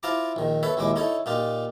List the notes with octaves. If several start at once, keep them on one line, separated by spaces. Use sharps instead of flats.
E4 F4 C5 A5 A#5 D6
A#1 D#3
A4 B4 C#5 E5
A#1 D#2 G#3 E4 D6
D#4 E4 A4 C#5
A#2 D#4 F4 G4